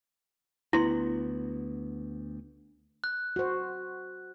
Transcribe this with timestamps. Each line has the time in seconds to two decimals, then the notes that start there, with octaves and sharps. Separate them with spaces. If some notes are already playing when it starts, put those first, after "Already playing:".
0.73 D2 B3 E4 C6
3.04 F#6
3.36 F#4 C5